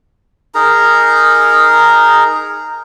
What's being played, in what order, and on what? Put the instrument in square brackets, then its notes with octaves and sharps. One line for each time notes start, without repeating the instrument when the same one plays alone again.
[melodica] D#4 G#4 A#4 A#5